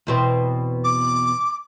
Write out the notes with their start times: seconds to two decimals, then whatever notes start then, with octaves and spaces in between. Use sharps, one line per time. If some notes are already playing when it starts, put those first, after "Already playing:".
0.07 E2 B2 C4
0.84 D6